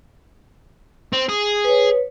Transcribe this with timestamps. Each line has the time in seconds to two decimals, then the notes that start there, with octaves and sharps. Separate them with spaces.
1.13 C4
1.29 G#4
1.64 B4 C#5